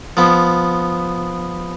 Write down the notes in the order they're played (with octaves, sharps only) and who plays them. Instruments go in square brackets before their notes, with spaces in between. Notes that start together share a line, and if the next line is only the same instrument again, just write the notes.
[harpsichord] F3 B3